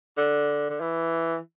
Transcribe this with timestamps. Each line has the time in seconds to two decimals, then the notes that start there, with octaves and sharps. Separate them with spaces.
0.18 D3
0.70 D3
0.80 E3